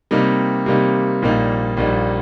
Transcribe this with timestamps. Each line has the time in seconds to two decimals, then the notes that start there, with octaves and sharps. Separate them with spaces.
0.11 C3 G3 A#3 D#4
0.66 C3 G3 A#3 D#4
1.22 A#1 A#2 G3 A#3 D#4
1.77 A#1 A#2 G3 A#3 D#4